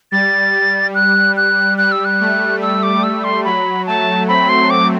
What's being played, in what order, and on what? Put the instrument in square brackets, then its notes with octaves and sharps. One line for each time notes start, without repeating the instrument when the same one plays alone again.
[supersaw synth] G3 [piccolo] A6
[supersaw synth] G3
[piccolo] F#6
F#6
[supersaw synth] G3 [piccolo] F#6
[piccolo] E6
F#6
[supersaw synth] A3
[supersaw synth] G3 [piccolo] E6
[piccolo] D6
E6
C6
[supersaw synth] F#3 [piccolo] B5
[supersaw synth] A3 [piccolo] A5
[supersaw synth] C4 [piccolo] B5
[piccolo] C6
D6